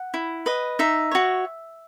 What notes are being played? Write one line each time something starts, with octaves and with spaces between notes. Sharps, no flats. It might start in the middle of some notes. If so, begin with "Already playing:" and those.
Already playing: F#5
E4
B4 D#5
D#4 E5
F#4 C#5